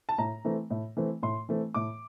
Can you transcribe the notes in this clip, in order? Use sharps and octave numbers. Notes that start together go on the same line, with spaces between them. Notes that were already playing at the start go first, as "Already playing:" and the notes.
A5
A2 A#5
E3 A3 C4
A2
E3 A3 C4
A2 C6
E3 A3 C4
A2 D6